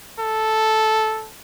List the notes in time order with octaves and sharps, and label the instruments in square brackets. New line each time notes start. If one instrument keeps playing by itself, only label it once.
[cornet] A4